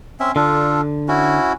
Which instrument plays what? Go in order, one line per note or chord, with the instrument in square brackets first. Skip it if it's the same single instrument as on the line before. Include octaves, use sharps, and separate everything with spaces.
[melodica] C4 C#4 E5
[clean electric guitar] D3 [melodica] D4 F4 A4
[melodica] C#4 E4 F#4